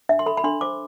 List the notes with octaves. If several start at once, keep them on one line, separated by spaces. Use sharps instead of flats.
D4 E5
C6
A4 B5
B5
D4 C6
C5 D6